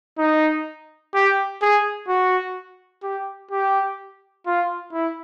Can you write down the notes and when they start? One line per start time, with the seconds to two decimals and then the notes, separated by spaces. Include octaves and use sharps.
0.19 D#4
1.15 G4
1.62 G#4
2.08 F#4
3.03 G4
3.51 G4
4.47 F4
4.93 E4